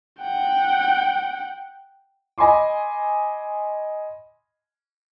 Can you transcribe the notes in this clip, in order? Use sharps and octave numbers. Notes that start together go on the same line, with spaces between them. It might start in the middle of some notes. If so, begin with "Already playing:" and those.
F#5 G5
D#5 G#5 B5 C6 D6